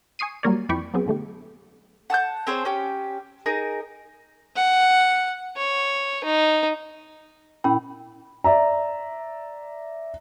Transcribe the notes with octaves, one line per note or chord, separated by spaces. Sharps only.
G#5 C#6 D#6 C7 D#7
F#3 G3 A#3 A#4 C#5 D5
F2 E3 D5 G5 B5 C#6
F#3 B3 C4 G#4
B2 D3 A3 G4
F#5 A5 E6 G6
C4 G#4 C5 C#5
C#4 G4
D#4 G#4 A#4
F#5
C#5
D#4
A#2 C#4 E4 G5 B5
D5 E5 A#5